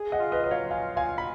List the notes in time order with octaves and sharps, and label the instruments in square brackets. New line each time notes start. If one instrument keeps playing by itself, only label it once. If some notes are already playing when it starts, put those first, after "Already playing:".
Already playing: [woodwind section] G#4
[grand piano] D#5 F#5
[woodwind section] F4
[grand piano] B4 D#5
[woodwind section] F#3 [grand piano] D#5
[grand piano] C#5 F5
[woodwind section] F4 [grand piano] F5 G#5
[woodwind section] F4 [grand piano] F5 G#5
[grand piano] B5